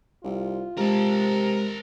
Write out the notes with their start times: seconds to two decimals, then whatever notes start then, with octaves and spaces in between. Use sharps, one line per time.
0.24 C2 F4
0.77 C3 G#3 A#4 A5